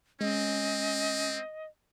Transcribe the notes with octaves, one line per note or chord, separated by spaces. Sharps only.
G#3 C4 C#4 D#5